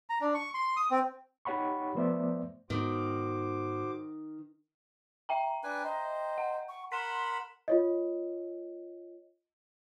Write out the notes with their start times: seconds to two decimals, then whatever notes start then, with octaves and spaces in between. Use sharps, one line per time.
0.10 A#5
0.21 D4
0.34 C#6
0.54 C6
0.77 D#6
0.91 C4
1.45 D#4 G4 C#5 F#5 B5 C#6
1.95 F3 A3 B3 C5 D5 E5
2.70 G#2 D#3 B3 F#4 C5 D6
5.29 E5 G5 A#5
5.63 D4 B4 G#5
5.84 C5 D#5
6.38 F#5
6.69 C#6
6.92 A#4 F#5 B5 C6 B6 E7
7.68 F4 C#5 D#5